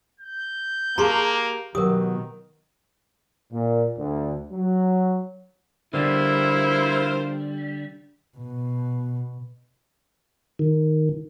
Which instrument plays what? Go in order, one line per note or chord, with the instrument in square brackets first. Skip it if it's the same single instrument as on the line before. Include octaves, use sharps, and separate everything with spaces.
[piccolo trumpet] G6
[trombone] A#3 [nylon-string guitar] G4 G#4 A5 [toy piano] A#5 C6 C#6
[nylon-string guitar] B2 F#3 G4 [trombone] D#3 [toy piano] A#4 D#6
[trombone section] A#2
D2
F#3
[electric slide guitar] D3 G3 [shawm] E4 [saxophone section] F4 A#4 C5
[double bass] B2
[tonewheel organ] D#3